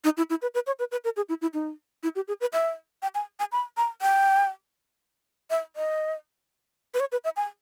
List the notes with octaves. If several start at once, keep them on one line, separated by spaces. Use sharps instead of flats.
D#4
E4
E4
B4
B4
C#5
B4
B4
A#4
G#4
E4
E4
D#4
E4
G4
G#4
B4
E5
G5
G#5
G#5
B5
A#5
G5
E5
D#5
B4
C#5
B4
E5
G#5